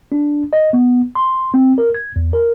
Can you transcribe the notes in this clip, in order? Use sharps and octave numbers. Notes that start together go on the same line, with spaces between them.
D4
D#5
B3
C6
C4
A#4
G#6
E2
A#4